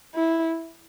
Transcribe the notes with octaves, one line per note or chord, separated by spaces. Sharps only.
E4